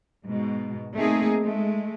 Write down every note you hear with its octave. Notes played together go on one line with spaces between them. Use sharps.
G#2 B2
A3 A#3 C4 D#4 G#4
G#3 A3